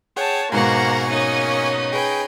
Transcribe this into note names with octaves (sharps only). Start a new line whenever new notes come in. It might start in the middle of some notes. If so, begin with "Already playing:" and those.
G#4 C#5 F#5 G5 A5
G#2 B2 A#3 C5 F#5 G#5 A#5 C#6
A#3 C#4 D#4 D#6
G#4 B4 G5 G#5